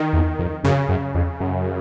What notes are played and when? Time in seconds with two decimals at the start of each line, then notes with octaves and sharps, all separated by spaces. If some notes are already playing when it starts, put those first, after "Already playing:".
Already playing: D#3
0.13 E2
0.39 F2
0.64 F#2 C#3
0.89 F#2
1.14 F2
1.40 F#2